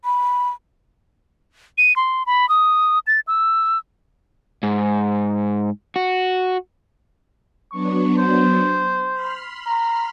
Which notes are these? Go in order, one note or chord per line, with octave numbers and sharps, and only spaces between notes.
B5
D#7
C6
B5
D#6
A6
E6
G#2
F#4
F#3 B3 D4 C#6
C5
B5 C6 F6
A#5